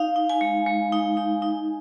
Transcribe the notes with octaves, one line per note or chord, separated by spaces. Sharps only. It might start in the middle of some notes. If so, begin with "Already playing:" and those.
Already playing: D#4 F5
D#4
G#5
G#3
G#3
D#4
D#4
D#4